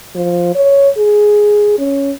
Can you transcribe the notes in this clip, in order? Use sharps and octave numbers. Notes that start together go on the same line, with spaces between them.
F3
C#5
G#4
C#4